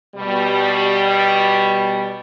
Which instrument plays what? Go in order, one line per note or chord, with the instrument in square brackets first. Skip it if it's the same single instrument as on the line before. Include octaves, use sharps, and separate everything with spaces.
[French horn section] B2 G3